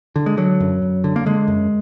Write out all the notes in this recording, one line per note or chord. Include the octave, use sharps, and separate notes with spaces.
D3
G#3
D3 F#3
F#2
F#2
D3
A#3
D3 G#3
F#2